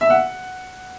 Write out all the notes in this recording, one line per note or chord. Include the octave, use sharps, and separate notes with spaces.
E5
F#5